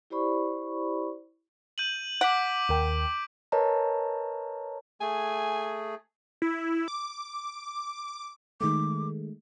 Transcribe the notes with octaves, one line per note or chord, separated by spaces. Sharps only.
E4 G4 C5 D5 B5 C#6
G6 D#7 F#7
F#5 D6 B6 D7
D#2 A#4 G5
A#4 B4 C#5 D#5 A5 A#5
A3 G#4 G#5
E4
D6
D#3 G#3 A3 D6